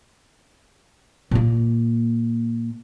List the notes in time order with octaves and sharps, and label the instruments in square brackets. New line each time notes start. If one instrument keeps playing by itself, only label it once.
[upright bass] A#2 A#3